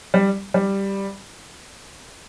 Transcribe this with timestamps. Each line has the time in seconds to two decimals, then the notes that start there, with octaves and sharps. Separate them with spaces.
0.14 G3
0.54 G3